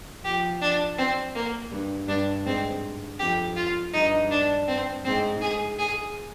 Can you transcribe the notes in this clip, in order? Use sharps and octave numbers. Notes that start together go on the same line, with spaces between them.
F3 G4
D4
C4
A#3
G2
G2 D4
G#2 C4
F2 G4
F4
G2 D#4
D4
C4
G#2 C4
G#4
G#4